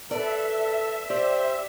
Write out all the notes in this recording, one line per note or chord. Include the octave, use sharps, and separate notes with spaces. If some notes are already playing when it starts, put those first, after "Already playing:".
A4 B4 D5 E5
G4 C5 D5